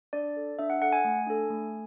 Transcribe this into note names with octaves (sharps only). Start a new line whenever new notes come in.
D4 D5
A4
D4 E5
F#5
A4 F#5
G#5
A3
D4 A4
A3